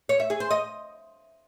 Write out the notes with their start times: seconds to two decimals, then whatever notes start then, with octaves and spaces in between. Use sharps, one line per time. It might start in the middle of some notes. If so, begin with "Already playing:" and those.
0.09 C#5
0.20 E5
0.30 G#4
0.40 C5
0.51 D#5